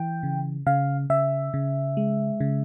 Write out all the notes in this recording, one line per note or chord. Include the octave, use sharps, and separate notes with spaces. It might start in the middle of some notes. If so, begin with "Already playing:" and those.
Already playing: E3 G5
C#3
C#3 F5
C#3 E5
C#3
G#3
C#3